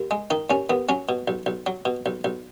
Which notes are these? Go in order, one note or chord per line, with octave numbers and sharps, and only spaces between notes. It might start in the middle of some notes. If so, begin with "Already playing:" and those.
Already playing: D#2
G#3
D#3 D#4
D#2 C#4
D#2 B3
F#3 C#4
B2
B1
B1
F#3
B2
B1
B1